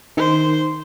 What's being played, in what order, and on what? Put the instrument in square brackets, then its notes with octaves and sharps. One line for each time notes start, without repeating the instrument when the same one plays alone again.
[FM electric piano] D#3 [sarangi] C5